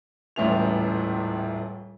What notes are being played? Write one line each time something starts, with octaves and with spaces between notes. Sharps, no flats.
D#1 C#2 A2 E3 F7